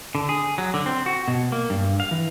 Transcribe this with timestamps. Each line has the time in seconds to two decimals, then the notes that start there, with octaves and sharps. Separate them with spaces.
0.15 D3
0.29 G#4
0.58 F#3
0.74 D3
0.86 C4
1.06 F#4
1.28 B2
1.52 A#3
1.70 G2
2.00 F5
2.11 E3